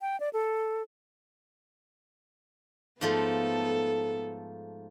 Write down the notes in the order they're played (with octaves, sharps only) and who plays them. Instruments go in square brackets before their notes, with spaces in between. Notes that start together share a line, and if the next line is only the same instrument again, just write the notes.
[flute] G5
D5
A4
[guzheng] G#2 F3 A3 [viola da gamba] B3 A4